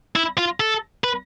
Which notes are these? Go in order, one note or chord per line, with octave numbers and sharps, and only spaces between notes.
E4
F4
A4
B4